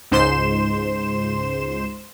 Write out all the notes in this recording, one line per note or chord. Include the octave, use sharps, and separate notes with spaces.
C#2 G#2 C5 C6 E7